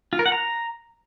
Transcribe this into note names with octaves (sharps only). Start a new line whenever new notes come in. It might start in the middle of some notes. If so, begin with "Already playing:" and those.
F4
A#4
F#5
A#5